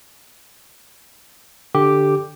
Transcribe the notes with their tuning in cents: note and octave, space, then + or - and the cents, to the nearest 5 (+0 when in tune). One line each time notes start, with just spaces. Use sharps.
D3 +0 G4 +0 D6 +0